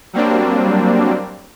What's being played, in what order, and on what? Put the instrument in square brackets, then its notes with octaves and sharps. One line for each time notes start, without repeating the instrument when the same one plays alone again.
[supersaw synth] F#3 G3 A#3 C4 D4